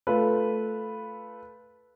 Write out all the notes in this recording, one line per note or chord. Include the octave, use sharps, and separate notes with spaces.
A3 F4 B4